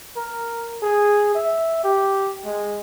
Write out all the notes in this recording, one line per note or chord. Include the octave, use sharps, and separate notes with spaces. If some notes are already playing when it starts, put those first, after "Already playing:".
A#4
G#4
E5
G4
G#3